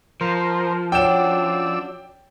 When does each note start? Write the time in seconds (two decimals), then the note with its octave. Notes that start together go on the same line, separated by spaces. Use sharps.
0.21 F3 A#4 C5
0.92 C#4 D4 F#4 D5 G5 E6 E7